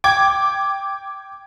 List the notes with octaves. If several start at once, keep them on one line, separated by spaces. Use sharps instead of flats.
G5 D6 G#6